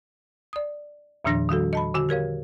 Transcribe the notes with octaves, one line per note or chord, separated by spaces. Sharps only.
D5 D#6
E2 A#2 D#3 F3 D4 A#6
D#3 G3 F#4 A4
D#5 A5 B5
D3 F#4 G#5
G4 A#4 C#5 F5